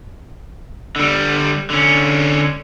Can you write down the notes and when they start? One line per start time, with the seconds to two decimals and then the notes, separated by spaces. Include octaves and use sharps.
0.96 D3 G3
1.70 D3 C#4